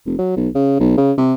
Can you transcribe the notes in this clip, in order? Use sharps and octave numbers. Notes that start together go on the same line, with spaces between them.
F1
F#3
B1
C#3
B1
C#3
C3